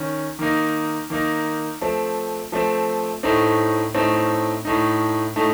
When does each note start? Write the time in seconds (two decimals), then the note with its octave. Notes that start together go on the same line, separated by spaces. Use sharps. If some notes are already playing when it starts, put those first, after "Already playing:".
Already playing: D#3 C#4
0.39 D#3 A#3 D#4
1.10 D#3 A#3 D#4
1.81 F3 A3 C4
2.52 F3 A3 C4
3.23 A2 A3 C4 D#4
3.95 A2 A3 C4 D#4
4.65 A2 A3 D#4
5.36 A2 A3 D#4